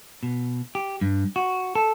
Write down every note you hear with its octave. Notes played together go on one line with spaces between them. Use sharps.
B2
G4
G2
F#4
A4